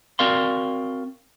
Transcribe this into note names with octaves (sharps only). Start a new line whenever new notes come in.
C4 F#4 A#4 D5 F5 C6